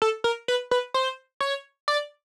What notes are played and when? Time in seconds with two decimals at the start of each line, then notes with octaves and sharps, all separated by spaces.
0.02 A4
0.24 A#4
0.48 B4
0.71 B4
0.94 C5
1.41 C#5
1.88 D5